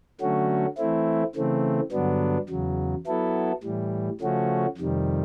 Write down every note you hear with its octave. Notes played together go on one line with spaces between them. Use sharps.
D3 F#3 A3 C#4 F#4
E3 A3 C4 E4
C#3 E3 A3 C4
G2 D3 F#3 B3 D4
E2 C#3 F#3
F#3 B3 E4 A4
A2 E3 G3
C#3 F3 A3 C#4 F#4
F2 C3 D#3 G3